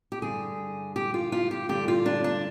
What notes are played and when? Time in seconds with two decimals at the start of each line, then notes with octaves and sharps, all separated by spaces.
0.12 G4
0.22 G2 D3 G#4
0.96 G4
1.14 F4
1.32 F4
1.51 G4
1.69 G2 D3 G4
1.88 F4
2.06 D4
2.24 D4